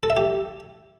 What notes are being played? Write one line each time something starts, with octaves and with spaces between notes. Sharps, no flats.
A4
E5
G4